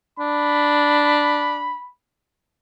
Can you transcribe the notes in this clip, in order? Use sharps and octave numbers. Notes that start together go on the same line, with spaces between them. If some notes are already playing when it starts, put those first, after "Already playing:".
D4 B5